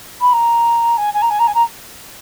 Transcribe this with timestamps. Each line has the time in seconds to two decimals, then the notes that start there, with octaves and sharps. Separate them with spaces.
0.21 B5
0.32 A#5
0.97 G#5
1.13 G#5
1.22 A#5
1.30 G#5
1.39 A#5
1.47 G#5
1.54 A#5